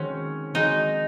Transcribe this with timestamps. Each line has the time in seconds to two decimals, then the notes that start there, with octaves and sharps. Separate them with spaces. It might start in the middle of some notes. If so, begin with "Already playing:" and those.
Already playing: D#3 G#3 C4 C#4 F#4
0.54 D#3 G#3 C4 D#4 F#4